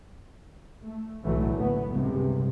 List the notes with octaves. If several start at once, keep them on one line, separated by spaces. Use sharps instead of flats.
A3
B1 A2 D3 E3 F#3 A3
D2 B3
C#2 G2 C3